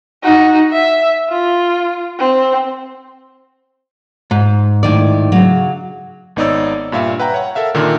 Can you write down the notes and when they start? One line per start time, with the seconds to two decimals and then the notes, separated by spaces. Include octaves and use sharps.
0.23 D#4 F#4
0.72 E5
1.29 F4
2.19 C4
4.31 G#2
4.83 A2 D#3 D5
5.32 C#3 F#3
6.36 G#1 B3 D#4 C#5 D5 E6
6.92 G2 A#2 E5 F5
7.19 B4 F#5 G5 A#5
7.34 C#5 F#5
7.55 A4 A#4 E5 F5
7.74 A#2 D3 D#3 A#3